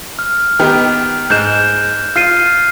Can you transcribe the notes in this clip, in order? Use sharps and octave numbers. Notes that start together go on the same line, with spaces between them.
F6
D#3 B3 G4
G#2 G#3 F#6 G6 E7
F4 F6 C7 D#7